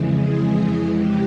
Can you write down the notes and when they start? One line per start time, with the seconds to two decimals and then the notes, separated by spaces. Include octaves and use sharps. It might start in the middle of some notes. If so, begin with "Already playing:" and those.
Already playing: F2 C#3 E3 G#3
0.20 G#4
0.93 G4